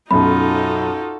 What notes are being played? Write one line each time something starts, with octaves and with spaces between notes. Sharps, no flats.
B1 F#2 D#4 F4 F#4 A4 B5